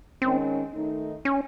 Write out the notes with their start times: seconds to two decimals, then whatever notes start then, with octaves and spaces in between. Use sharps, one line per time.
0.22 D#3 G#3 C4 C#4
0.74 D#3 A3 D#4
1.25 C#4